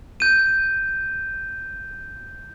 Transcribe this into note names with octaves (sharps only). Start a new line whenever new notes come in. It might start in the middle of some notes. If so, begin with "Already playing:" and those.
G6 D#7